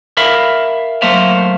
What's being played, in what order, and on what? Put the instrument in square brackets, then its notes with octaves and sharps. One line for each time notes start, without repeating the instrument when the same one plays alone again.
[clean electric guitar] A#4 E5 F5 B5
F#3 A3 A#3 C5 E5 F5